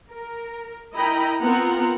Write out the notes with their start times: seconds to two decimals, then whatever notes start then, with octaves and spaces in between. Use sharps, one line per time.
0.13 A#4
0.95 E4 A#4 D#5 G5 A#5 B5
1.42 B3 C4 F4 A#4 F#5 A#5